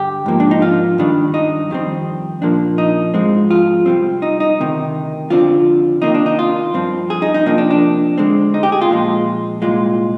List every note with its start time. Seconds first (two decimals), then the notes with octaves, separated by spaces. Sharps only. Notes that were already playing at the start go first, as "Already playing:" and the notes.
Already playing: G2 D3 G3 D4 G4
0.26 G#2 F3 A#3
0.40 D4
0.51 D#4
0.62 F4
0.98 G2 D#3 G3 D4
1.34 D#4
1.70 F2 D#3 G3 C4
2.42 A#2 F3 A#3 D4
2.78 D#4
3.14 G#2 F3 G#3 C4
3.51 F4
3.86 C3 G3 C4
4.22 D#4
4.40 D#4
4.59 D2 C3 D#3
5.30 F2 D3 F3 C4 F4
6.02 C3 D#3 A#3 D#4
6.15 D4
6.26 D#4
6.39 F4
6.74 G2 F3 C4
7.10 G#4
7.22 D#4
7.34 D#4
7.46 F2 C3 F3 A#3 D4 D#4
7.58 D4
7.71 D4
8.18 D2 D3 G#3 C4
8.54 D#4
8.63 G4
8.72 G#4
8.82 F4
8.90 A#2 F3 G#3
9.62 C2 A#2 G#3 F4